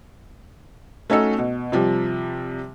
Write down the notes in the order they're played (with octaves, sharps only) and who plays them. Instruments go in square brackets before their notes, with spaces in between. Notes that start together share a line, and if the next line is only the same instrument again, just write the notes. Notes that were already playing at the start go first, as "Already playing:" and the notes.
[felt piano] A3 C#4 D#4 F#4 A4
B2
C3 F3 G3